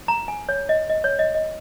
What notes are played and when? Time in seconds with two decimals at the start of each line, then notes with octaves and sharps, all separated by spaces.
0.08 A#5
0.28 G#5
0.49 C#5
0.69 D#5
0.89 D#5
1.04 C#5
1.19 D#5
1.35 D#5